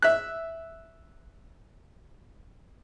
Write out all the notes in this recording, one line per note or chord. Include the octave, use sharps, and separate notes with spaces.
E5 F#6